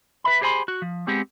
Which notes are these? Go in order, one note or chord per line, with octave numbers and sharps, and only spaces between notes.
B4 E5 B5
G4 G#4 C5 G#5 B5 C6
F#4
F3
G#3 B3 C4 G4 G#4